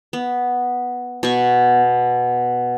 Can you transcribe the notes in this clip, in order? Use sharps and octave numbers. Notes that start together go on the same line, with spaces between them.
B3
B2 C#6